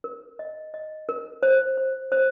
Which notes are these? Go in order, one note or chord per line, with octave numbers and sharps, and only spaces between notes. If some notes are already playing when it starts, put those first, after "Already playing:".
A#4
D#5
D#5
A#4
C5
C5
C5